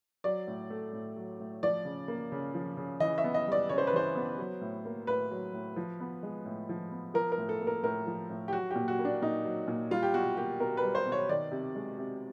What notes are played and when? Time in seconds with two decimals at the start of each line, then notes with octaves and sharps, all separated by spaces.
0.24 F#3 D5
0.47 A2
0.70 A3
0.93 A2
1.16 F#3
1.40 A2
1.63 F3 D5
1.85 C#3
2.08 A#3
2.32 C#3
2.54 F3
2.77 C#3
3.00 E3 D#5
3.18 E5
3.24 B3
3.34 D#5
3.47 G3
3.52 D5
3.69 C#3 C#5
3.78 C5
3.87 B4
3.93 E3 C5
4.16 B3
4.38 F#3
4.61 A2
4.85 A#3
5.07 A2 B4
5.31 F#3
5.53 A2
5.76 F3
6.00 B3
6.23 G#3
6.45 A2
6.69 F3
6.92 B3
7.14 F3 A#4
7.32 A#4
7.38 A2
7.49 A4
7.61 A#3
7.67 A#4
7.83 A2 A#4
8.07 F3
8.30 A2
8.48 G4
8.53 F#3 F#4
8.71 A#2 G4
8.88 F#4
8.99 A#3
9.05 D4
9.22 A#2 D#4
9.45 F#3
9.68 A#2
9.91 G3 F4
10.03 G4
10.14 B2 F#4
10.37 A#3 G4
10.60 B2 A#4
10.77 B4
10.83 G3
10.95 C5
11.06 B2
11.12 C#5
11.29 D#3 D5
11.51 C3
11.75 G#3
11.98 C3